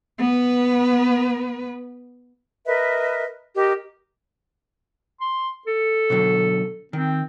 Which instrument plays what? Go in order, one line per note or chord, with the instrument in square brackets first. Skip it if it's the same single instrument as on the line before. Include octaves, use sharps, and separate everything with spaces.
[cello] B3 B4
[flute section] A#4 B4 D#5 E5
G4 A#4 D#5
[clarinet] C6
A4
[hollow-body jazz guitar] B2 D3 F#3
[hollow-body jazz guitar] D#3 [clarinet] C4